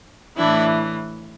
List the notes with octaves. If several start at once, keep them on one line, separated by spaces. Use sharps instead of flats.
A2 E3 D4 E4